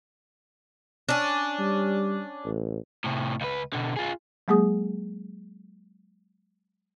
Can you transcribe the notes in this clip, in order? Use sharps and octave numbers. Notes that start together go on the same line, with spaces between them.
C#4 D4
G3
A1
A2 C3
C#2 B4
B2 D3
F4 G#4
F#3 G#3 A#3 G#4 D#6